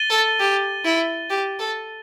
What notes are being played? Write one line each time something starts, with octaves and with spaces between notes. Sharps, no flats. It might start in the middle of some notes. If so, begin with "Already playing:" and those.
Already playing: A6 D#7 G7
A4
G4
E4
G4
A4